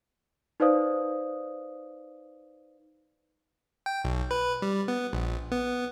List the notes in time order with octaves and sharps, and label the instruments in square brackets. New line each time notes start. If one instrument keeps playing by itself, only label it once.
[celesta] D#4 B4 C5 D5 F5 D#6
[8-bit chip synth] G5
B1
B4
G3
B3
A#1
B3